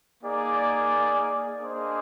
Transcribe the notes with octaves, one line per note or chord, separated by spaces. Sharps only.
A#3 D#4 G#4 D5
A#3 D4 G#4 C5 D#5